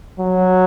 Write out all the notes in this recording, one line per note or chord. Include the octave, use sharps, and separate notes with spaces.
F#3